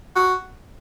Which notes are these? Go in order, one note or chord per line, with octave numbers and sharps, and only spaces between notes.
F#4